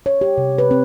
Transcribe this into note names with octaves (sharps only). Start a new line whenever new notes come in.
C#5
G4
C3
B4
C4